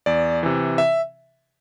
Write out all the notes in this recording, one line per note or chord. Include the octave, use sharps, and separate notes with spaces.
E2 D5
C3 E3
E5